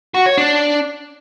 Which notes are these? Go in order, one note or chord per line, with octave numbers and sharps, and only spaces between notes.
F#4
C#5
D4